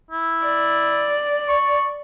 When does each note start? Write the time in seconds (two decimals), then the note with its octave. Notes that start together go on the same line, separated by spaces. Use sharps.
0.11 E4
0.45 D5
1.48 C#6